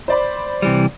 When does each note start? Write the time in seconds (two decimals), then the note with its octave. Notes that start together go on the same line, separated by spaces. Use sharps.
0.08 C5 D5 B5
0.62 C3 E3 G3